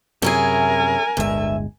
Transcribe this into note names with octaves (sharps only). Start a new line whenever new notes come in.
F#2 C3 C#4 E4 G#4 A#4 G#5
D1 G1 G2 G#3 E5